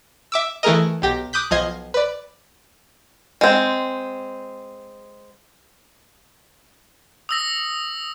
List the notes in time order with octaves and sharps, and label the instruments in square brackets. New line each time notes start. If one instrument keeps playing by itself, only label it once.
[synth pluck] E5 D6 E6
E3 A3 G#4 A#4 D#5
B1 G4 A#6
D6 D#6 F#6 G6 B6
B1 F3 D#5 G#6 C7
B4 D5
[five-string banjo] G#3 C4
[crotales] D#6 E6 A#6